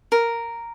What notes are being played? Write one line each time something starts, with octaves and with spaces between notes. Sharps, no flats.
A#4